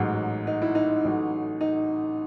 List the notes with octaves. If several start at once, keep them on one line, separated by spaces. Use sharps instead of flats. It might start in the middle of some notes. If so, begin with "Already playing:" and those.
Already playing: A1 G#2 F#3 D#4
D#4
E4
D#4
A1 A2 F#3
D#4